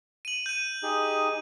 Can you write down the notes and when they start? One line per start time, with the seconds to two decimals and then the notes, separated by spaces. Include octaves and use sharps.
0.25 D#7 F#7
0.46 G6 D#7
0.83 D#4 G4 G#4